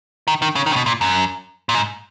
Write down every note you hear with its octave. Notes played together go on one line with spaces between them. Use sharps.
D#3
D#3
C#3
D#3
C#3
B2
A#2
F#2
A#2
G#2